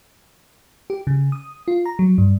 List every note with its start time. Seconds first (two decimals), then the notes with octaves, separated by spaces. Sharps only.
0.90 G4
1.07 C#3
1.32 D#6
1.68 F4
1.86 A#5
1.99 F#3
2.18 G2